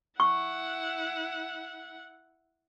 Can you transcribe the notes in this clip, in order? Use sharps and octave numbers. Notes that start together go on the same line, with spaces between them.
E4 F#5 C#6